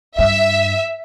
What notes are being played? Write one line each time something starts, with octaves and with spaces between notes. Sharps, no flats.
G2 E5